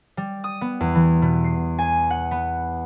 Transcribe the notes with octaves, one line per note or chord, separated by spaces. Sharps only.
G3
D#6
B3
E2
E3
B2
C7
G#5
F#5
B3